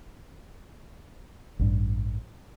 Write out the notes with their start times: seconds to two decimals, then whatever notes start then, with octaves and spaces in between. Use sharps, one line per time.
1.59 A1 G2